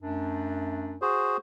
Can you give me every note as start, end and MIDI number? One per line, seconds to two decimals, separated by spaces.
0.02 0.98 42
0.02 0.98 57
0.02 0.98 62
1.02 1.37 66
1.02 1.37 68
1.02 1.37 72